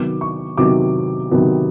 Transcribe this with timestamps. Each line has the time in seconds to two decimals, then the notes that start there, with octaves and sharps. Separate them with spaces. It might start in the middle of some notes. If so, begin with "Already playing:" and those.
Already playing: C3 D#3 F#3 B3 D6
0.21 C#6
0.57 C3 D#3 F#3 B3 D6
1.31 C3 D#3 F#3 B3